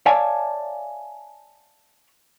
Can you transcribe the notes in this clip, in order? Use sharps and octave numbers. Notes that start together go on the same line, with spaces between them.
C#5 D5 E5 F5 G#5 A5